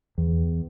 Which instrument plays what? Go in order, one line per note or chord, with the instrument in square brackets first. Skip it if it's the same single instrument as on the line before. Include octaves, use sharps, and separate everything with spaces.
[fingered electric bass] E2